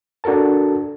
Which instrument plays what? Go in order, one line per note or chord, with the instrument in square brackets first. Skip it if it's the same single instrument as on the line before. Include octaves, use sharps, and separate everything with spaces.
[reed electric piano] D4 F#4 A4 A#4 A5